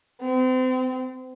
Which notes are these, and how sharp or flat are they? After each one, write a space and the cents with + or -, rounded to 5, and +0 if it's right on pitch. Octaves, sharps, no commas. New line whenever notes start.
C4 -35